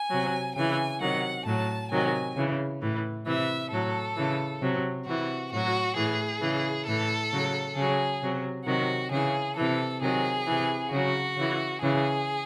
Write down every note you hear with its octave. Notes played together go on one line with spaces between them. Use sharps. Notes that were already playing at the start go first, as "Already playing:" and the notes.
Already playing: G#5
C3 F#3
C#3 E3 G#5
C3 D#3 F#3 F#5
A2 F#3 A5
C3 D#3 F#3 G#5
C#3 E3
A2 E3
C3 E3 E5
A2 F#3 A4
C#3 E3
C3 F#3
C3 E3 F#4
A2 F#3 F#4
A2 E3 G#4
C#3 E3
A2 E3 A4
C#3 F#3
C#3 F#3 G#4
C3 F#3
C3 D#3 F#3 F#4
C#3 E3 G#4
C3 E3 A4
C3 D#3 F#3 G#4
C3 E3
C#3 F#3 F#4
C#3 E3
C#3 E3 G#4